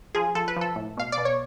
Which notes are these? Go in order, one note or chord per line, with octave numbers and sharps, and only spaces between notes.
F3 G#4
F3 A4
B4
F3 A4
A2
B2 F5
D5
B2
C#5